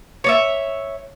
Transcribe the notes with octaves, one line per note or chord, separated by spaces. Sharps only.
C#5 D5 E5